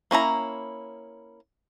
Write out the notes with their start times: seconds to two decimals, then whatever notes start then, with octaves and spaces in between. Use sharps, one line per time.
0.11 A#3 C#4 E4 A#5